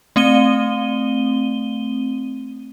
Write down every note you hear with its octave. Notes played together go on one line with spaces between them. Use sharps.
A3 C4 D#7 G7